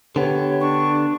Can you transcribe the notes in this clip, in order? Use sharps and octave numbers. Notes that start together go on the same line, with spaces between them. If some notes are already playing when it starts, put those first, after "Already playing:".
D3 B3 G4 C#5
D4 C#6